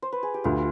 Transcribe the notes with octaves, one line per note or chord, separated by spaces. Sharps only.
C5
B4
G#4
G4
D2 F4